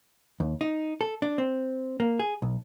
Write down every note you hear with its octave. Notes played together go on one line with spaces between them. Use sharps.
D#2
D#4
A4
D4
C4
A#3
G#4
B1